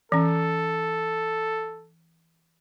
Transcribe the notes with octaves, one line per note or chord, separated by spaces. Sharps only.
E3 C#4 A4